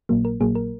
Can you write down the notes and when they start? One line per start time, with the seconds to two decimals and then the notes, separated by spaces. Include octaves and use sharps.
0.09 A#1 A#2 F#3 A#3
0.25 A#4
0.40 A#1 A#2 F#3 A#3 G#4
0.55 A#4